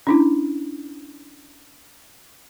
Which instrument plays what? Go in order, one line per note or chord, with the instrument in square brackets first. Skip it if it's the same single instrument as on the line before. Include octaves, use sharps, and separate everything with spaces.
[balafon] C#4 D4 E4